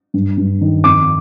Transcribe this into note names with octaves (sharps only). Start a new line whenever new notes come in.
G2
G2
D#3
F2 D6